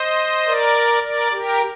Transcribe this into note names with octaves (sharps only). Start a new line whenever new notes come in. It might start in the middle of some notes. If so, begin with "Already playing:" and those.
Already playing: C5 D#5
A#4 D5
A#4 D5
G4 A#4